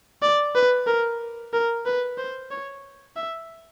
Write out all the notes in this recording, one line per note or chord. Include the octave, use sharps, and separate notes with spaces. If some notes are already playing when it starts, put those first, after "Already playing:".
D5
B4
A#4
A#4
B4
C5
C#5
E5